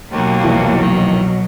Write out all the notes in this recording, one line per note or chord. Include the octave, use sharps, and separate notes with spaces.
D#2 B2 F#3 A#3
C2 F2 E3
D#3